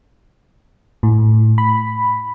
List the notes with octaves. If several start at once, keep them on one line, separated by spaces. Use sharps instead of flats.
A2
B5